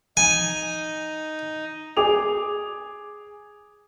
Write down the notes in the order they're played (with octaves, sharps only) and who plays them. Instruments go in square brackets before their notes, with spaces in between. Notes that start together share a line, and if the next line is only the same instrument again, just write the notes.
[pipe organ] D#4 [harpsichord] G#5 [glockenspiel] D#7
[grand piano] G#4 D6 F7